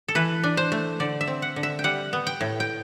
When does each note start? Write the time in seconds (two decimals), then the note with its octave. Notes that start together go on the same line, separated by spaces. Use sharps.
0.08 A4
0.15 E3 B4
0.43 D4
0.57 C5
0.72 A3
1.00 D3 D5
1.21 E5
1.27 C4
1.42 F#5
1.56 D3
1.63 E5
1.79 G5
1.84 G3 F#5
2.13 B3
2.27 G5
2.41 A2
2.60 G5